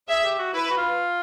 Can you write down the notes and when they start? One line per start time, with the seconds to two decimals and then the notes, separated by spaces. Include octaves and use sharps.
0.09 G#4 E5
0.24 G4
0.39 F#4
0.54 E4 B4
0.70 F#4
0.77 F4